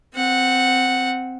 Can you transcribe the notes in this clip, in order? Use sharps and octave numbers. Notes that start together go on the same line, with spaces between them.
C4 F#5